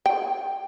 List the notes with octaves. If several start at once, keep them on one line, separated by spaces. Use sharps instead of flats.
G5